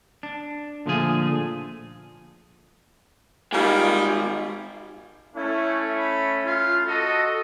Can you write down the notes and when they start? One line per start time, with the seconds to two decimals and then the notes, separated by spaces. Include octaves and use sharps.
0.23 D4
0.86 A#2 D3 F3 A3 F4 G#4
3.53 D#3 G3 G#3 A#3 F4
5.36 A3 C#4 E4
5.99 B5
6.46 F4
6.86 F#4 A4 D#5